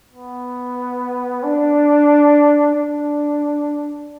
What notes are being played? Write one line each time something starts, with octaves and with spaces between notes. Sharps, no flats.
B3
D4
D4